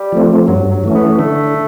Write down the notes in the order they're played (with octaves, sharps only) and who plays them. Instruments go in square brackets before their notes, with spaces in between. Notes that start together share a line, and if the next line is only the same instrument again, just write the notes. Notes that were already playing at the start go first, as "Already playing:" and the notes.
Already playing: [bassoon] G3
[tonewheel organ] F3 A3 C4
[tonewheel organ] G2 [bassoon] F#3
[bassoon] F#3
[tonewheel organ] E3 A3 C#4
[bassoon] B3
[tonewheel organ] D3 [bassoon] A3